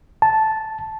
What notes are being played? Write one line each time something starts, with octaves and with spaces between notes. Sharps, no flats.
A5